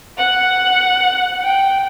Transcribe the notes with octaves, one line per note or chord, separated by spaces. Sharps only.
F#5
G5